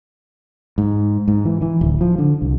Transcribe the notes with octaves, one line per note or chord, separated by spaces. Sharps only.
G#2
G#2
E3
E3
D1
F3
D3
C2